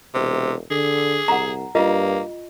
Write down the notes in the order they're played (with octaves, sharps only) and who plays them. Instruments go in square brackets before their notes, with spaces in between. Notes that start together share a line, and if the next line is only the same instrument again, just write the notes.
[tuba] E1 [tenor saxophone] C3
[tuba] D3 [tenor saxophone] G#4
[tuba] C2 [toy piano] F#5 A#5
[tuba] G2 [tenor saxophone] A#3 [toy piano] F4 D#5